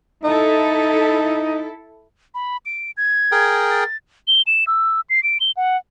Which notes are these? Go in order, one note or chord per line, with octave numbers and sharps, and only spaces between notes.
D#4 E4 A4
B5
D7
G#6
G#4 A#4 G5
A6
G7
E7
E6
C7
D7
G7
F#5